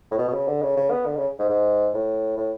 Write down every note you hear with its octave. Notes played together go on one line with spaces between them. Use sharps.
A2
B2
B2
C#3
D3
C#3
C#3
B3
D3
C#3
G#2
G#2
A2
A2